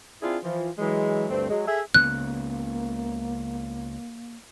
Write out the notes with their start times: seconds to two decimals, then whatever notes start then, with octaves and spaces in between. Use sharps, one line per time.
0.22 C4 D4 E4 F4 G#4
0.43 E3 F3
0.78 E3 F#3 G#3
1.30 D2 G2 A3 C4
1.50 F#3 G#3
1.67 G#4 A4 E5
1.94 C#2 C#3 A#3 B3 F#6